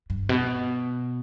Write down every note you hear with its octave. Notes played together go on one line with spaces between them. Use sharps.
G2
B2